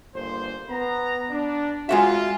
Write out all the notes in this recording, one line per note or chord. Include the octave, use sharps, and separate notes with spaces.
G1 A#3 C5
B3 A#5
D4
G#3 F4 F#4 E5